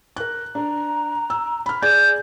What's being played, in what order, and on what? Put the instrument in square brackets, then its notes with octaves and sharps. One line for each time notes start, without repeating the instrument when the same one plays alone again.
[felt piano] A#4 F#6
[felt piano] D4 [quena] A#5
[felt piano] E6
B5 F6
[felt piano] G#4 D5 G#6 [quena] G6